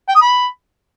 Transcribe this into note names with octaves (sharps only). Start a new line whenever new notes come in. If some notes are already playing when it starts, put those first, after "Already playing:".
G5
D#6
B5